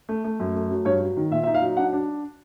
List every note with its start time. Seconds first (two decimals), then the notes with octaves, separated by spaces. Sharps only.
0.09 A3
0.24 A3
0.40 F#2
0.55 A3
0.70 F#3
0.85 G2 C#5
1.01 F#3
1.17 D#3
1.31 A#2 E5
1.43 D#4 E5
1.54 F5
1.61 F#3
1.77 D4 F#5
1.93 D4